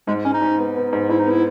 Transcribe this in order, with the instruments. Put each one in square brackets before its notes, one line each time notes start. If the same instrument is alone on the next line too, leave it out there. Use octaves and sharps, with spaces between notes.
[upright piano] G#2 [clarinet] G#3
[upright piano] G#2 [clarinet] C#4
[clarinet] D#4
[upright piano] G#2
B3
B3
G#2
[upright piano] G#2 [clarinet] E4
[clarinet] D#4
[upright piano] B3 [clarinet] E4